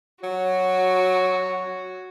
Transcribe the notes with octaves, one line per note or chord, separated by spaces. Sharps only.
F#3 F#4 C#5